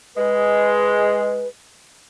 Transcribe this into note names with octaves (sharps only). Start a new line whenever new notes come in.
G#3 B4